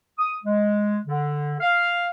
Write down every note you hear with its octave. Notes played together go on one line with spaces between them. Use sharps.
D#6
G#3
D3
F5